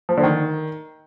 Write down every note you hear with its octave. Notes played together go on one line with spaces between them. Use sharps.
F3
D3
D#3